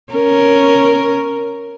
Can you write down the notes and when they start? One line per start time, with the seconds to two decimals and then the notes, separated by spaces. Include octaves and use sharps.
0.13 C#4 A#4